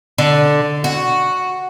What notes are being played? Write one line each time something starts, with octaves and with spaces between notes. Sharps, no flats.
D3
F#4